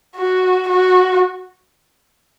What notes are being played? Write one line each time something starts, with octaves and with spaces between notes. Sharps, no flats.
F#4
F#4